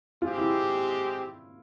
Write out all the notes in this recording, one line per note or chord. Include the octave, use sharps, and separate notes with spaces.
G#3 C4 F4 G4
E4